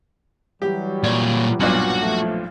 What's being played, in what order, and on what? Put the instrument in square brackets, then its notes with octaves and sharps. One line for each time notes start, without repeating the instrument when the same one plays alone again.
[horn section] E3 F#3 G3 [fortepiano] G4
[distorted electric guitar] A#2 C#5 [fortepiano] D5
[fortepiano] B1 G2 A#2 [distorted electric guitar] F#4 F#5
[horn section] F3 A3